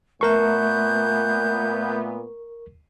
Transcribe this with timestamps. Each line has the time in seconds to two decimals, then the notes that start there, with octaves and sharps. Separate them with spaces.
0.21 A#2 A3 B3 A#4 E5 C#6 F#6 G6